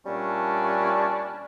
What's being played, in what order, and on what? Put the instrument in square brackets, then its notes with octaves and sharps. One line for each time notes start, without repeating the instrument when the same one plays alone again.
[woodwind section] A#2 G3 A3 C#4 D4